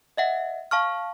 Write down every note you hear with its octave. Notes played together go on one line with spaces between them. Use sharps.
D#5 E5 F#5
F5 A5 C#6 F6